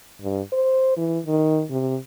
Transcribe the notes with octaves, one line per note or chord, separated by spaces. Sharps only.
G2
C5
E3
D#3
C3